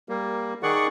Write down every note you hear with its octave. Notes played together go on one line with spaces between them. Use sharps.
G3 A#3
D#3 G#4 D5 F#5 C#6